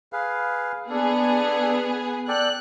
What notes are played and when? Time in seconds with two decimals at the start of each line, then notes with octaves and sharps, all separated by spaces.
0.13 G#4 B4 F5
0.90 B3 D4 G#4 A4
2.28 A4 D5 G5 F#6